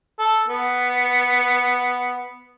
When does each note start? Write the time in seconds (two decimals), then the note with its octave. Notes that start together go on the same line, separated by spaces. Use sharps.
0.19 A4
0.48 B3